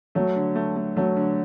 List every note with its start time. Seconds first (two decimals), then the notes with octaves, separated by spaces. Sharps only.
0.15 F#3 A3
0.36 D3
0.55 A3
0.76 A3
0.97 F#3 A3
1.17 D3